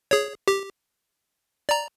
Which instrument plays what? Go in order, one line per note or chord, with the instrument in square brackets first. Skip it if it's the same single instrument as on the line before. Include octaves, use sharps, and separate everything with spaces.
[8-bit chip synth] G#4 C#5
G4
D5 A#5